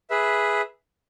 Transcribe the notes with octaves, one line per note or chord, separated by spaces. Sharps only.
G#4 B4 E5